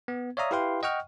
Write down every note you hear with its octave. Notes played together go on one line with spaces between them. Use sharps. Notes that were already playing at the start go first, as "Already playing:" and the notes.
B3
C#5 D5 E5 F5 A#5 D#6
E4 G4 B4 F5 G5 C6
D#5 F#5 G5 C#6 F6